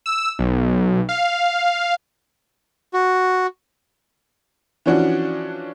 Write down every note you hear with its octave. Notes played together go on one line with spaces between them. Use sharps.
E6
B1
F5
F#4
E3 F3 C#4 D4 F#4